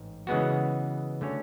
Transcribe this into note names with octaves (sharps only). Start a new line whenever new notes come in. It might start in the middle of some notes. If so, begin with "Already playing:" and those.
Already playing: A1 G#2 G#3
C#3 E3 G#3 B3 F#4
D3 A3 C#4 F#4 C#5